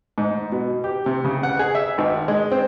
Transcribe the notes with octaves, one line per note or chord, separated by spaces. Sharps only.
G#2
B2
G4
C3
C#3
F#5
G#4
E5
G#1
G#3
C4